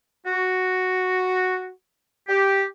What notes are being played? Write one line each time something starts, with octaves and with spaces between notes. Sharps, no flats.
F#4
G4